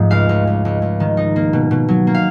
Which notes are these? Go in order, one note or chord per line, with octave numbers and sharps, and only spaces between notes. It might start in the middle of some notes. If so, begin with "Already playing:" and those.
Already playing: G#2 F3 A3
C#2 F5
C#2
C#2
C#2
C#2
D#3
D#4
A#3
B2
B2
F#3
A#3
F5